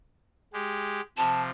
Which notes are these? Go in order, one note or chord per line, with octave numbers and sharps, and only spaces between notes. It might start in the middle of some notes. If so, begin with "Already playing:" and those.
G#3 G4
C3 F3 A5